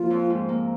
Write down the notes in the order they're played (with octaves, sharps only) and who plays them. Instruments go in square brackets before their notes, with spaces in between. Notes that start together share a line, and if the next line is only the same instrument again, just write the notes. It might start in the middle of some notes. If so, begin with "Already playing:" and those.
Already playing: [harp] F3 A#3 [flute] F4
[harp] F2
G#2
A#3